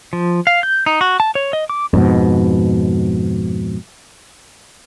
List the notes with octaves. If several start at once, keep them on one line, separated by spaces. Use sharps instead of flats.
F3
F5
G6
D#4
F#4
A5
C#5
D#5
D6
F2 G#2 B2